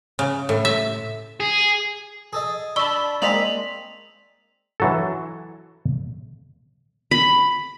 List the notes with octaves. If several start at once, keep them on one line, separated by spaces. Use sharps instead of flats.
C#3
A2
E5
G#4
G#4 A4 D#5
D4 A5 B5 C#6 E6 G7
G#3 A#3 C4 D#4 D5 B6 F7 F#7
E3 F#3 A4
B5